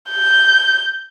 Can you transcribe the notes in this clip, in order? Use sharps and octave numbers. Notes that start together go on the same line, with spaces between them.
G6